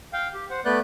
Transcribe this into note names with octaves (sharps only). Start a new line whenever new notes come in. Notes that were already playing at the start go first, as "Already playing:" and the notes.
F5 G5
G4
C5 F#5
A3 B3 B4 D5 F#6 G6